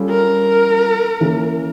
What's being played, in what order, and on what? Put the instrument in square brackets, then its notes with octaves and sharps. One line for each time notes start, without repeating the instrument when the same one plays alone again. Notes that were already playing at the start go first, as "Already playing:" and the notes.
Already playing: [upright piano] G3 C#4 F4 A4
[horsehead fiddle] A#4
[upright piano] E3 A#3 C#4